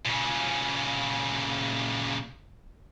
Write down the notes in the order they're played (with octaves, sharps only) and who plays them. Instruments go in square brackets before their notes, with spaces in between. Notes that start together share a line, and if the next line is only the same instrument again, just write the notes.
[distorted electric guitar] A#2 C#3